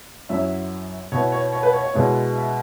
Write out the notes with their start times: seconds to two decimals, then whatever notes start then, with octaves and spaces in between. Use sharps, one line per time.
0.29 F#2 F#3 C#4 E4 E5
1.12 B2 B3 E4 C#5
1.32 C#5
1.53 C#5
1.63 B4
1.73 C#5
1.84 C#5
1.94 B2 G#3 B3 E4
2.35 E5